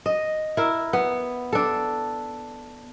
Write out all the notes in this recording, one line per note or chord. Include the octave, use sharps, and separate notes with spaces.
D#5
E4 A#4
B3
D4 A4